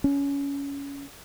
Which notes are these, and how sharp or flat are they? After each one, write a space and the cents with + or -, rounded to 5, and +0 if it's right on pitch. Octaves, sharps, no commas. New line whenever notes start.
C#4 +20